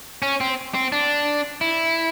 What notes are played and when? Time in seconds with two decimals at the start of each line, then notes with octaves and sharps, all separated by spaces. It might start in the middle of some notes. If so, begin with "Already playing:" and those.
0.22 C#4
0.41 C4
0.74 C4
0.92 D4
1.61 E4